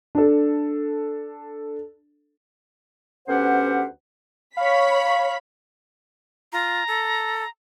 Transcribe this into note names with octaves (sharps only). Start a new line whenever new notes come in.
D4 A4
D2 B3 C#4 G4 C5 F#5
C#5 F5 B5 B6
F4 A#5
A4